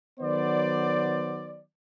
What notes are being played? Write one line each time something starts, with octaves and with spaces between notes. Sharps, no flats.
D#3 F#3 B3 C5 D5